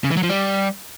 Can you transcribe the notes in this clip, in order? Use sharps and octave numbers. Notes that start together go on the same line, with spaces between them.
C#3
E3
F#3
F3
G3